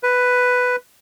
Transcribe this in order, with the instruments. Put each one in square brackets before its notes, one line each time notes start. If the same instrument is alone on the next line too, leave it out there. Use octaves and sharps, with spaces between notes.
[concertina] B4